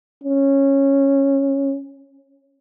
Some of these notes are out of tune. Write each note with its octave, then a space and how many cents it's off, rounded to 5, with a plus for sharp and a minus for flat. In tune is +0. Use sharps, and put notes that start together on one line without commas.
C#4 -10